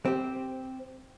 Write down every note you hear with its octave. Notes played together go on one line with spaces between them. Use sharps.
C4 G4